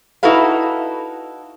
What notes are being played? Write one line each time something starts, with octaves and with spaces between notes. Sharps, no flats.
D#4 E4 F#4 A4 B4 F5